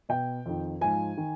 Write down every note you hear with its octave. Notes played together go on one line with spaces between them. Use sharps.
B2 G5
F2 D#3
G#2 F3 G#5
D#3